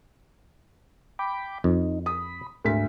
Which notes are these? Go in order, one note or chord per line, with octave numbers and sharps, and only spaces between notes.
G5 B5 D6
F2 D#4
B5 D#6
D2 G#2 B6